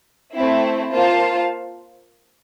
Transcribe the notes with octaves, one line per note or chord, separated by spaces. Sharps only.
A3 C4 E4
A#3 F4 C5 F5 A5